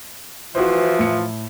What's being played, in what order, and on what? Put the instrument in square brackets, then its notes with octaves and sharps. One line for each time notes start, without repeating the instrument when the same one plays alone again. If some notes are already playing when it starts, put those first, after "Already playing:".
[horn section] E3 F3 [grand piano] F#4 C5
[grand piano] A2 C#7